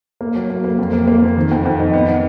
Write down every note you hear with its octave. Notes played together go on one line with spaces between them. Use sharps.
A#3
F#3
A#3
A#3
F2
A#3
A#3
F2
D#3
F2
F2
D#4
B3
B3